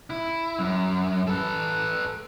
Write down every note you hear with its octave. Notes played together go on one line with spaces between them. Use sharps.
E4
F#2
A4 B4